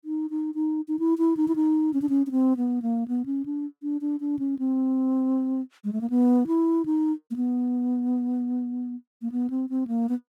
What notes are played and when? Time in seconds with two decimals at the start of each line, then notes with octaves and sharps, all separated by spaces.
0.05 D#4
0.30 D#4
0.55 D#4
0.88 D#4
0.99 E4
1.18 E4
1.37 D#4
1.48 E4
1.56 D#4
1.94 C#4
2.02 D4
2.09 C#4
2.27 C#4
2.31 C4
2.57 B3
2.82 A#3
3.08 B3
3.26 C#4
3.45 D4
3.82 D4
4.01 D4
4.20 D4
4.39 C#4
4.59 C4
5.84 G#3
5.93 A3
6.01 A#3
6.10 B3
6.47 E4
6.86 D#4
7.31 A#3
7.36 B3
9.22 A#3
9.32 B3
9.50 C4
9.70 C4
9.87 A#3
10.09 B3